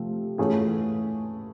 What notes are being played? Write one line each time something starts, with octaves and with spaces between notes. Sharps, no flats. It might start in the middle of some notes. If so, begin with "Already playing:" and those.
Already playing: C3 F3 A3 C4
E3 A3 C#4 F4 G#4